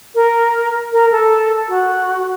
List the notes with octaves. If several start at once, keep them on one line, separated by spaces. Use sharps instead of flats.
A#4
A#4
A4
F#4